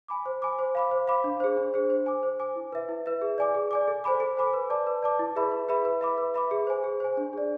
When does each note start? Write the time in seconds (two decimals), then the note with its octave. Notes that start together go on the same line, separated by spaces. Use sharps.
0.08 G#5 B5 D6
0.26 C5
0.42 G#5 B5 D6
0.59 C5
0.75 F5 B5 D6
0.91 C5
1.08 F5 B5 D6
1.24 D4
1.40 G#4 C5
1.57 D4
1.74 G#4 C5
1.90 C5
2.06 G#5 D6
2.23 C5
2.39 G#5 D6
2.56 E4
2.72 B4 E5
2.89 E4
3.06 B4 E5
3.22 G#4
3.38 D5 G#5 D6
3.55 G#4
3.71 D5 G#5 D6
3.88 A4
4.04 C5 G#5 B5 D6
4.20 A4
4.37 C5 G#5 B5 D6
4.53 B4
4.70 D5 A5 D6
4.87 B4
5.02 D5 A5 D6
5.19 E4
5.36 G#4 B4 E5 B5
5.52 E4
5.69 G#4 B4 E5 B5
5.85 B4
6.01 E5 B5 D6
6.18 B4
6.34 E5 B5 D6
6.51 G#4
6.67 C5 G#5
6.84 G#4
7.00 C5 G#5
7.17 D4
7.33 G#4 D5